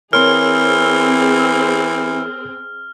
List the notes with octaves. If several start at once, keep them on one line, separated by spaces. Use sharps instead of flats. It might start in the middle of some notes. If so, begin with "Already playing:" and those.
E3 C4 G#4 A#4 C#5 C6 F6